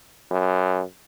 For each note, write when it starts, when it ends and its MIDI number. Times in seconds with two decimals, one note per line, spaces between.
0.31 0.83 42